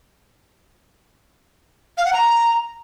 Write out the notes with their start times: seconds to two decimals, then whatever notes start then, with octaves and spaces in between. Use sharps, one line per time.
1.98 F5
2.05 F#5
2.13 A#5